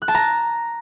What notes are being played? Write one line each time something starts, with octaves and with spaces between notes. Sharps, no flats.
F#6
A5
A#5